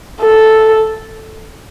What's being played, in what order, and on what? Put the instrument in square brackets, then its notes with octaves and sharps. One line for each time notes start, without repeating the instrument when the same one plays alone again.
[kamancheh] A4